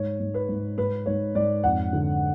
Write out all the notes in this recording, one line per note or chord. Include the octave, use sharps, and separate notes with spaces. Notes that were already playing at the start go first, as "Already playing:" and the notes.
Already playing: G#2 C#5
G#2
B4
G#2
G#2 B4
G#2 C#5
G#2 D5
F2 F#5
D3